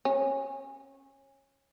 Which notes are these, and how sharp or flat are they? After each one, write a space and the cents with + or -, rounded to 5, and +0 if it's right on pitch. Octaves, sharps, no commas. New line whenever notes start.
C#4 -20